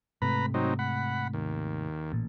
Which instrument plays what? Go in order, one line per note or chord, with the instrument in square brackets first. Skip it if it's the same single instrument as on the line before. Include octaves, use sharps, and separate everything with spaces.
[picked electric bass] G#2 C3 A3 [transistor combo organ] B4 A#5 B5
[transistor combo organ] F#3 C4 D#4
F#5 B5
D#2
[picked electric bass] A1 A#2